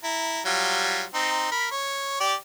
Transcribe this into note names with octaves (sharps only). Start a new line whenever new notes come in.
E4 A#5
F#3 G3 F4
C4 D#4
A#4 B5
C#5
G4 D5